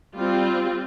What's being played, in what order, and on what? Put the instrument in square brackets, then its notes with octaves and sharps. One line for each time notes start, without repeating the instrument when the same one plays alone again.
[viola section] G3 C4 F4